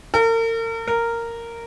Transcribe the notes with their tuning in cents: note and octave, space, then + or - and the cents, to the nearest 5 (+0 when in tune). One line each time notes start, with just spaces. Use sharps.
A#4 -40
A#4 -10